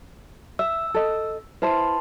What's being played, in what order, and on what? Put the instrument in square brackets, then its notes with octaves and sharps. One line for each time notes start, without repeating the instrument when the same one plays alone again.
[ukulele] E5 [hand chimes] E6
[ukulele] A4 D#5
[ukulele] E4 C5 [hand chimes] B4 A5 C6